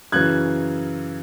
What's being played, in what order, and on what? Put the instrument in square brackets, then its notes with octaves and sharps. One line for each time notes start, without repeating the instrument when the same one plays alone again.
[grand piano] F#2 C#3 E3 F#6 G#6